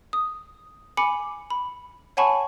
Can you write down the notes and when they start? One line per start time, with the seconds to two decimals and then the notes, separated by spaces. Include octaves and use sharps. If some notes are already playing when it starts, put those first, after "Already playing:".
0.13 D#6
0.97 G#5 B5 D6 C#7
1.50 B5
2.17 C#5 F#5 G#5 A5 B5 C#6